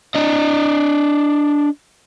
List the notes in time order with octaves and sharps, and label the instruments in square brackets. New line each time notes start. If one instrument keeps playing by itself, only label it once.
[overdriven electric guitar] D4 D#5